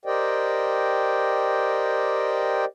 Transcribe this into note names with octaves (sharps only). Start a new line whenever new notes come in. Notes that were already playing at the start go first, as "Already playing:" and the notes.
G4 A#4 C5 D5 D#5 G5